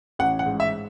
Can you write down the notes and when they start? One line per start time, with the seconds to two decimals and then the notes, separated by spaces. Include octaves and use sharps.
0.19 A1 F#5
0.39 F#5
0.46 G#2
0.60 E5